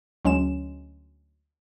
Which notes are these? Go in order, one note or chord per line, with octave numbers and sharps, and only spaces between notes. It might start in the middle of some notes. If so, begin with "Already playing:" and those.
D2 F#3 G#3 C#4 E7